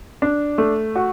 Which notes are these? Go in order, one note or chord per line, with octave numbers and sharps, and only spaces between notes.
D4
A3
F#4